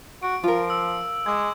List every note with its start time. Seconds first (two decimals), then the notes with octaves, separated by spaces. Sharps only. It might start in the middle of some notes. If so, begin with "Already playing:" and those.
0.23 F#4 D7
0.44 F3 F4 A#4
0.70 E6
1.26 G#3 D6 G#6